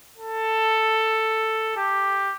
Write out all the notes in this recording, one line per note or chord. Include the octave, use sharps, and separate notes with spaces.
A4
G4